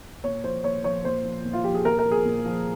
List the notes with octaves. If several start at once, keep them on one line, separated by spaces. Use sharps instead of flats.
A#2 C#5
F3 C5
A#2 C#5
F3 C#5
A#2 C5
F3
A#2
F4
F3 G4
G#4
A#2 A#4
A#4
F3
G#4
A#2
F3